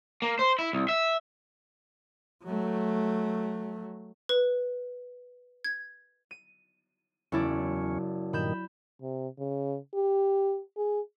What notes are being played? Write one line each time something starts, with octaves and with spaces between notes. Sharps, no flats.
A#3
C5
E4
C2
E5
F#3 A3
B4
G#6
D#7
F#1 E2 C#4 E4 D5
G2 A#2 D#3 B5 G6 E7
C3
C#3
G4
G#4